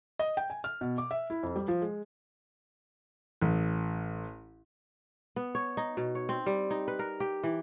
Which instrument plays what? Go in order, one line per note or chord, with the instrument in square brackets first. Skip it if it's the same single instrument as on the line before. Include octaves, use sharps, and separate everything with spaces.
[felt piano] D#5
G5
G#5
F6
B2
D6
E5
E4
F2
G3
F3
G#3
[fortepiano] A1
[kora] B3
C#5
D#4
B2
C#5
C4
G3
D#4
B4
A#4
G4
E3